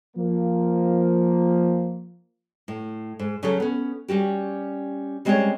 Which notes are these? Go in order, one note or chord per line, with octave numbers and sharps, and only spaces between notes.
F3 A#3
A2
G#2
C#3 F#3 C#4 G#4 A4
B3 C#4
G3 C#4 F#4 G4
G3 G#3 C4 C#4 G#4 C#5